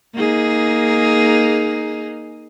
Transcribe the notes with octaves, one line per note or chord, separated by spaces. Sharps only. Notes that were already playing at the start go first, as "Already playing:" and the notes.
A#3 D#4 G#4